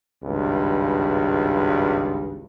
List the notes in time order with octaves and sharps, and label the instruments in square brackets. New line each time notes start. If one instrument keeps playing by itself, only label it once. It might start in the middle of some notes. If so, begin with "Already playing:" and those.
[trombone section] G#1 C#2 G2